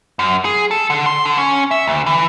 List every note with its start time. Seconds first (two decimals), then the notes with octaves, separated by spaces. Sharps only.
0.19 F#2
0.45 G#4
0.71 A4
0.90 D3
1.06 C6
1.26 D3
1.38 C#4
1.71 E5
1.87 D2
2.06 E3